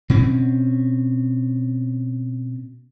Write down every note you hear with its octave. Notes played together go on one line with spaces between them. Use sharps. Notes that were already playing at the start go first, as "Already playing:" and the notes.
B2 C4 C#4